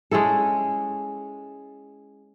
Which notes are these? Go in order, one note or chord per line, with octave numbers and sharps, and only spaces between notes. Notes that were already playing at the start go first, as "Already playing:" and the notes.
G#3 C#4 E4 A4